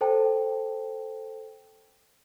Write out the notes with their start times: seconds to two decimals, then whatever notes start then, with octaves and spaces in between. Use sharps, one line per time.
0.01 A4 C5 G5 A5